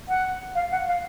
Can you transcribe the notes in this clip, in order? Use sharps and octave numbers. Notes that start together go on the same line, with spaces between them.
F#5
F5
F#5
F5